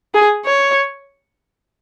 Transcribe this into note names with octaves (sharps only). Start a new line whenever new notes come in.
G#4
C#5